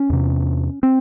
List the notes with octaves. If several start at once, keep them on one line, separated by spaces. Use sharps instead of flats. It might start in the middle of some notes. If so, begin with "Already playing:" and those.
Already playing: C#4
E2 C3
C4